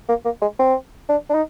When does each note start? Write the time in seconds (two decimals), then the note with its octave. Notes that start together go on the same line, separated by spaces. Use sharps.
0.09 A#3
0.25 A#3
0.42 G#3
0.59 C4
1.09 D4
1.30 D4
1.35 D#4